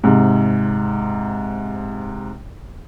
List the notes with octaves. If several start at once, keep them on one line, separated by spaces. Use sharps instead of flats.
G#2 C3